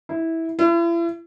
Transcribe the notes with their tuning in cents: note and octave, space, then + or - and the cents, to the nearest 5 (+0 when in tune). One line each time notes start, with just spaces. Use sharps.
E4 -15
E4 +40